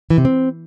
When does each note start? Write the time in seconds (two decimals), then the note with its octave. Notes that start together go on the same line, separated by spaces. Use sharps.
0.10 E3
0.18 C3
0.25 C4